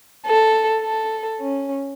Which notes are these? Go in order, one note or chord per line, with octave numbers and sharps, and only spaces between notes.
A4
A4
C#4